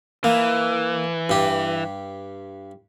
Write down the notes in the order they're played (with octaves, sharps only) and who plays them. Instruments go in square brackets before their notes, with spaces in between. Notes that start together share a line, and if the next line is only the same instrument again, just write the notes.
[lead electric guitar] E3 [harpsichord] A#3
[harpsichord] G2 G4